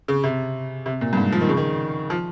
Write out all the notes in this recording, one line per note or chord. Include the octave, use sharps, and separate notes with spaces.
C#3
C3
C3
A#2
G2
G#2
F3
D#3
C#3
D#3
F3